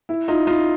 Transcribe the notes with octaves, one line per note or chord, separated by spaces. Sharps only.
E4
D#4 F4
D#4 F4